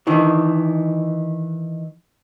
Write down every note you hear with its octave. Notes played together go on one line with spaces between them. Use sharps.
D#3 E3 D4